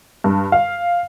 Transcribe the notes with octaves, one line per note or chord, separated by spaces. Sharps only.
G2
F5